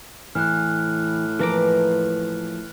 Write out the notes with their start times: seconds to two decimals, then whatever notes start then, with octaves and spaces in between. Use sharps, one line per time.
0.35 A2 E3 F6 F#6
1.39 E3 F3 A#3 B4 A#5 D6